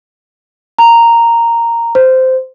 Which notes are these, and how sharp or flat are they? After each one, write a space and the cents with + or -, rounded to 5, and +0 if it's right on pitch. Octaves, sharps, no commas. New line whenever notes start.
A#5 -5
C5 -10